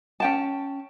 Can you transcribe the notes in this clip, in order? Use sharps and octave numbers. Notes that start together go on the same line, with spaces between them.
C#4 G5 A5